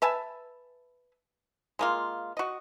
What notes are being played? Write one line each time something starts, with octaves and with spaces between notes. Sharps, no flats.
B4 E5 G#5 A5
G#3 A#3 F4
F#4 D#5